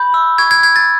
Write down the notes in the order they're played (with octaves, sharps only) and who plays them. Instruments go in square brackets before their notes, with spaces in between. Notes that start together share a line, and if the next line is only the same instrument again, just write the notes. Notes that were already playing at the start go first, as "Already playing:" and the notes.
Already playing: [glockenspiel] B5 G6
E6
C#6 G#6
G#6
G6 G#6
A6